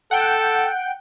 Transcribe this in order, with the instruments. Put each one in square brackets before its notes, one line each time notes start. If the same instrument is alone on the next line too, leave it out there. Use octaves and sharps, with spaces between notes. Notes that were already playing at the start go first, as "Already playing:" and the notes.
[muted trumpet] A4 [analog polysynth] F#5 G5